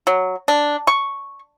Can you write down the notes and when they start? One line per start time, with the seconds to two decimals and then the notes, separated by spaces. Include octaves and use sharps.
0.07 F#3
0.48 D4
0.87 C#6